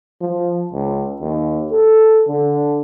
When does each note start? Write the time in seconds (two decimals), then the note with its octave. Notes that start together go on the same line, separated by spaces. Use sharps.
0.21 F3
0.72 C#2
1.21 D#2
1.72 A4
2.27 D3